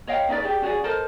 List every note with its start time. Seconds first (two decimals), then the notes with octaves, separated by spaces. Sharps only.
0.07 C#5 D#5 F5 G5
0.28 C#4 D#4 B4 D5
0.42 G4 G#4 D5
0.62 C#4 F#4 G#4 D5
0.84 A4 A#4 C5 D#5